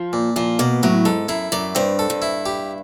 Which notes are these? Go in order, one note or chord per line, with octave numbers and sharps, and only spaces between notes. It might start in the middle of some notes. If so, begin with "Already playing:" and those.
Already playing: F3
A#2
A#2 F3
B2 A#3
A2 F#3
G#2 A4
F#2 E4
F#2 D5
G2 C4
A4
G2
E4
G4